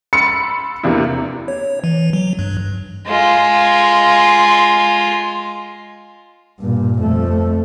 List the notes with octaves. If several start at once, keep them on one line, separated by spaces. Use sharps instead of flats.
B5 C6 E6 A6 C#7
E2 C3 A#3 D4 E4
C#5
E3
F#3
G2
G#3 F4
G2 A#2
F2 A3